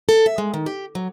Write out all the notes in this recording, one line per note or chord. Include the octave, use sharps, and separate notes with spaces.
A4
E5
G#3
D#3
G4
F#3